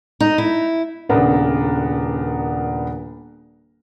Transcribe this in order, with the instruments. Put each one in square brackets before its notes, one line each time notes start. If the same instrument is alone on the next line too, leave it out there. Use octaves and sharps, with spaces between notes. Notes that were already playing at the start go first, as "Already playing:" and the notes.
[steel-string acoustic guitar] D#4
E4
[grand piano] D#1 C#3 B3 D4 A#4